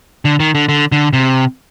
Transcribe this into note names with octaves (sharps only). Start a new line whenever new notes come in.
D3
D#3
D3
D3
D3
C3